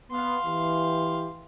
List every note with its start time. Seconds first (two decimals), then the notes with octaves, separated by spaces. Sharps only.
0.11 B3 F5 C6
0.45 E3 G4